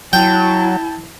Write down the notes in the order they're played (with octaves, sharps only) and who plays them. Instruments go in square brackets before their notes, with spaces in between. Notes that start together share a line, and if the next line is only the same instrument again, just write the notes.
[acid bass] F#3 [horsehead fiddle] E4 A5 [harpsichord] G5